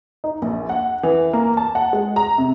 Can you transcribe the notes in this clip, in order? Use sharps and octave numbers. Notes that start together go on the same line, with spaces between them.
D#4
A#1
F#5
E3
A#3
A5
F#5
G#3
A#5
C3